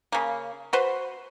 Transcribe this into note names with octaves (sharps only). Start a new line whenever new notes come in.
C#3 A#3
F#4 B4 C5